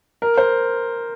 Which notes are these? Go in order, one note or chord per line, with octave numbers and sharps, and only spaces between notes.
A#4
C5